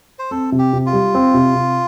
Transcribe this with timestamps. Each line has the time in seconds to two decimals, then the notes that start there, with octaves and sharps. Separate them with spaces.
0.19 C5
0.31 C4 A4
0.52 C3
0.59 G4
0.73 C3
0.86 F4
0.93 G3
1.15 C4
1.34 C3
1.55 C3